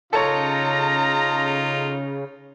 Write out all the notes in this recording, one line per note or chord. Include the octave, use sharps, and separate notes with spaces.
C#3 D#4 F4 A4 C#5 A#5